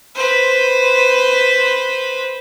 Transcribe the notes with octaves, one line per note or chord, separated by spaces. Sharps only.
B4 C5